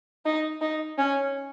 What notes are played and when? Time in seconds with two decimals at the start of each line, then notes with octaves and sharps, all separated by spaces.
0.25 D#4
0.61 D#4
0.98 C#4